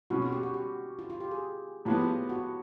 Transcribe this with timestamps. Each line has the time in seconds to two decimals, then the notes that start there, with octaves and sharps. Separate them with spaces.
0.10 B2 G#3 C#4 F#4
0.22 F#4
0.32 G4
0.43 F#4
0.54 G4
0.99 F4
1.10 F4
1.20 G4
1.31 G#4
1.85 A2 F3 G#3 B3 G4
2.29 F#4